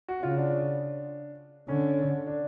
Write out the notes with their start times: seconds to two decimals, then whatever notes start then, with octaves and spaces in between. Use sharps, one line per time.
0.08 F#4
0.22 C#3 F4
0.38 D4
1.68 D3 C#4
2.27 D4